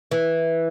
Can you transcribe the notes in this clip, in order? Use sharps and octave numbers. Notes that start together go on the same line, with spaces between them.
E3